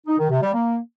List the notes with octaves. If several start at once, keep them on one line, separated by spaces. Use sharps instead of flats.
D#4
D#3
C3
G3
A#3